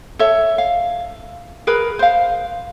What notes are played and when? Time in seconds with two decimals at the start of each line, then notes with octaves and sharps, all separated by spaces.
0.19 A4 C#5 E5
0.58 F5
1.67 G#4 A#4 B4
1.99 C5 F5